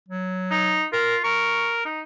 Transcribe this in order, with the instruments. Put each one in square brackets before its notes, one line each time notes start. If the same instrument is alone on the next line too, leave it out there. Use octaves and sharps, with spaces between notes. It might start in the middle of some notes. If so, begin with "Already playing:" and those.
[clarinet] F#3
[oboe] D#4
[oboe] F4 [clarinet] A#4
[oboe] A#4 [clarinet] C#6
[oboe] D#4